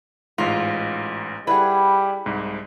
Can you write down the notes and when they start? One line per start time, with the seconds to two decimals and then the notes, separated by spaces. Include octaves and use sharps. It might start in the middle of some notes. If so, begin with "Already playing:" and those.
0.38 A1 G#2 F4
1.47 G3 E4 G#4 B4 F#5
2.26 C2 G#2